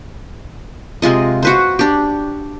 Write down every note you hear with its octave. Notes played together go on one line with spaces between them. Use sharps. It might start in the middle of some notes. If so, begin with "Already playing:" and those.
C3 G#3 F4 D#5
F#4 B4 C5
D4 G4